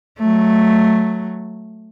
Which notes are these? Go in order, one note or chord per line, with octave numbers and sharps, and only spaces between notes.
F#3 A3